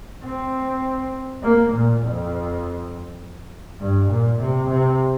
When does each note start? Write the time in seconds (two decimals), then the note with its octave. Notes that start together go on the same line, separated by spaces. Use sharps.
0.24 C4
1.43 A#3
1.73 A#2
2.02 F2
3.80 G2
4.09 A#2
4.39 C3
4.69 C3